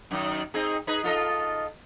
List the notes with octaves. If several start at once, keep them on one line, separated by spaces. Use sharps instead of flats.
F#2 D#3
C4 D#4 G#4
D#4 G#4 B4
F4 A4 D#5